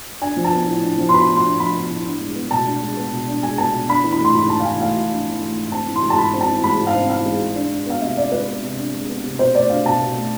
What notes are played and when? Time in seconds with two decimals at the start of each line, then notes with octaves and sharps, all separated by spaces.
0.21 D4 G#5
0.36 F3
0.44 A5
0.53 B3
0.68 A2
0.83 D4
0.98 F3
1.09 C6
1.14 B3 B5
1.29 A2
1.36 C6
1.45 D4
1.60 F3 B5
1.75 B3
1.90 A2
2.05 D4
2.21 G#3
2.36 B3
2.51 B2 A5
2.66 D4
2.82 G#3
2.97 B3
3.12 B2
3.28 D4
3.43 G#3 G#5
3.58 B3 A5
3.74 B2
3.89 D4 B5
4.04 E3
4.12 B5
4.19 A3 C6
4.34 G#2 B5
4.50 D4 A5
4.60 F5
4.65 E3 G#5
4.80 A3 F5
4.95 G#2
5.11 D4
5.26 E3
5.42 A3
5.57 G#2
5.72 C4 A5
5.88 E3
5.95 C6
6.03 G#3
6.10 A5
6.18 G#2 B5
6.34 C4
6.41 A5
6.49 E3
6.64 G#3 B5
6.79 G#2
6.87 F5
6.94 C4
7.10 E3 F5
7.25 G#3
7.41 G#2
7.55 D4
7.72 G#3
7.86 B3 F5
8.01 C3 E5
8.17 D4 D5
8.32 G#3 B4
8.47 B3
8.63 C3
8.78 D4
8.93 G#3
9.09 B3
9.24 C3
9.39 B2 C5
9.54 A3 D5
9.70 D4 F5
9.85 B2 A5
10.01 B2
10.15 A3